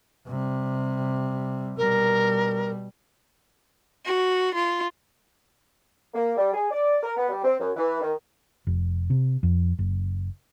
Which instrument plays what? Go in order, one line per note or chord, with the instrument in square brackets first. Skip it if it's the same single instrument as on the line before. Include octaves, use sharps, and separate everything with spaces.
[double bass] C3 G3
[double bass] B2 G3 [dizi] A#4
[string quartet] F#4
F4
[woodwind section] A#3
G3
G#4
D5
A#4
B3
G3
C4
F#2
E3
D#3
[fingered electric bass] F1
C3
F2
F#1